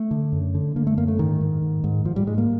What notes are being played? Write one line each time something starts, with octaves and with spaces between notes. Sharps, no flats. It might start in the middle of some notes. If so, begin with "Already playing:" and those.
Already playing: A3
D3
F#2
D3
D3 A#3
A3
F#2 A#3
A3
G#2 D#3
G#2
G#2
G#2
G#2 F3
G3
G#2 G#3
A#3